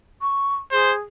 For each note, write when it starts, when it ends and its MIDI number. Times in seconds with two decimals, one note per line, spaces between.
0.21 0.55 85
0.72 0.95 68
0.72 0.94 72